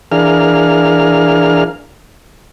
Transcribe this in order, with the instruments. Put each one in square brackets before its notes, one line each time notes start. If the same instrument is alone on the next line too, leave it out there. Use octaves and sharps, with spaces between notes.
[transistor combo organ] E3 D4 G#4 A#4 F5 F6